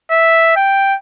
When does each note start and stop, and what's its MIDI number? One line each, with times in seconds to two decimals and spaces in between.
0.11 0.53 76
0.56 0.95 79